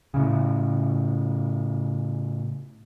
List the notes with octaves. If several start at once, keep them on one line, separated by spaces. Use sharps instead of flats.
A2 C#3